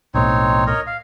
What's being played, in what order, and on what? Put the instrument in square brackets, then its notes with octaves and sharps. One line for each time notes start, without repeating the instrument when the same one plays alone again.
[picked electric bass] B1 A2 [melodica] C4 D#4 C#5
[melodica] A#4 C#5 D#5
F5